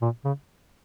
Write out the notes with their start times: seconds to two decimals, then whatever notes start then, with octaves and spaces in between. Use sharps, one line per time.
0.02 A#2
0.25 C#3